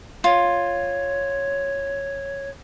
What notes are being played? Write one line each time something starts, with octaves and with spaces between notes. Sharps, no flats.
F4 C#5